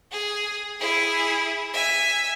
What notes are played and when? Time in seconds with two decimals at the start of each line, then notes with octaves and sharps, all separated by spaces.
0.12 G#4
0.80 E4 G#4
1.74 E5 G#5